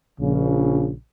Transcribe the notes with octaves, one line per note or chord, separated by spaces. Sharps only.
A#1 C#3